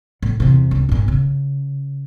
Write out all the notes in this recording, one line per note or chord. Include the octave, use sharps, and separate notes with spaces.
A2
E2 C3
C#2
G#1 A#2
C#3